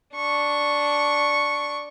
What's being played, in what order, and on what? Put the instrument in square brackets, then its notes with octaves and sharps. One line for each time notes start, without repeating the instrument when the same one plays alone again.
[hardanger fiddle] D4 C#6